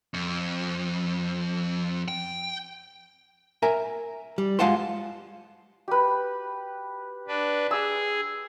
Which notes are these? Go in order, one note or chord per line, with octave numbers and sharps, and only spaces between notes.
F2
G5
A#4 E5 G#5 A#5
G3
G#3 F4 F5 F#5 A5 C6
G4 B4
D4 B4
G#4 E6